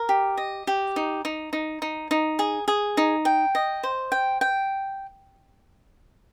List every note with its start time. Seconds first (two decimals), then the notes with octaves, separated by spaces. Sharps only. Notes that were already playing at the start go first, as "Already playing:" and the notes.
Already playing: A#4
0.09 G4
0.37 D#5
0.67 G4
0.96 D#4
1.25 D#4
1.53 D#4
1.82 D#4
2.11 D#4
2.39 G#4
2.68 G#4
2.97 D#4
3.25 G5
3.55 D#5
3.83 C5
4.12 G5
4.41 G5